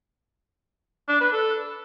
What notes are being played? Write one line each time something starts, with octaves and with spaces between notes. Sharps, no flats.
D4
B4
A4